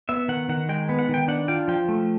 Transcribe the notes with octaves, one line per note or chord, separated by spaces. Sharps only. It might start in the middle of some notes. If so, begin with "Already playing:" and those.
B3 E5
D#3 F#5
D#3 F#5
G#3 G5
B3
F#5
D#3 G5
D4 F#5
F4 G5
F3 G5
A3